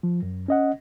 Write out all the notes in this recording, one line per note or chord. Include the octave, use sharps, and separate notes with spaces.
F3
F#2
C#4 D#5 F#5